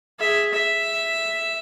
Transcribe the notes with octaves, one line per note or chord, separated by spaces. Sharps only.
G#4 E5
E5